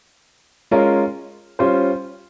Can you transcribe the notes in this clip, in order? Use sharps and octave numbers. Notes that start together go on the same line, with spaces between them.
G#3 C#4 F4 A#4 C#5
G3 C#4 F4 C5